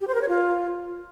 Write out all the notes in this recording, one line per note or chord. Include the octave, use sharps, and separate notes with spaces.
G4
C5
A#4
C#5
F4